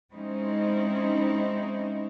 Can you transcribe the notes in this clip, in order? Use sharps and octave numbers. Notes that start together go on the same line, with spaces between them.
G#3 C4 C#4 D#4 E4